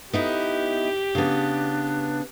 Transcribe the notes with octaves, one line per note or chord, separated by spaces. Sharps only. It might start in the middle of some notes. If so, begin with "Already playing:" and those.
B3 D#4 E4 G4
C#3 B3 D4